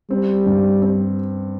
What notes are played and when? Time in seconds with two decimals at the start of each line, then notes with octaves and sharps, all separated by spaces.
0.10 G3 C4
0.46 G2
0.82 C4